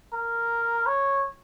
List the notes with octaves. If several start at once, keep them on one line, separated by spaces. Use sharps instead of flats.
A#4
C#5